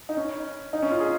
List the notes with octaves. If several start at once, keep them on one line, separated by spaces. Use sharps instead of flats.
D#4
C#4
D#4
C#4
F4
G#4